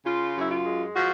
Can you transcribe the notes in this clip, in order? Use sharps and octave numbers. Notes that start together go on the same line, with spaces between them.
C#3 F4
F#2
E4
F4
G#3
F3 F#4